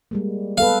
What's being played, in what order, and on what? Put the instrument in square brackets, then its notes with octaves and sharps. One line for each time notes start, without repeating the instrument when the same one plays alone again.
[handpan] G3 G#3 A#3
[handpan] B3 A4 B4 [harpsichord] F5